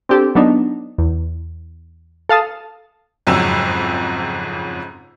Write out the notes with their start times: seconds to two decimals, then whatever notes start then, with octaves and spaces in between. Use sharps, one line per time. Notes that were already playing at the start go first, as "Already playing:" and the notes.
0.09 C4 D4 G4 A4
0.35 F#3 B3 D4 D#4
0.98 E2
2.29 A4 F5 A5 D#6
3.27 F#1 F2 G#2 F#3 E6 E7